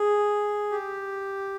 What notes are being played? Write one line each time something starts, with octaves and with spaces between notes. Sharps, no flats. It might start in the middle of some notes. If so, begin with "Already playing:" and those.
Already playing: G#4
G4